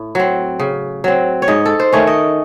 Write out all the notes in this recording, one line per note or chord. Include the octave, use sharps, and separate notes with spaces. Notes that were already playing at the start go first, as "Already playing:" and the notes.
Already playing: A2
F#3 C4
C#3
F#3 C4
C#5
G#2 D#5
A4
C5
D#3 A3 C#4 C#5
D#5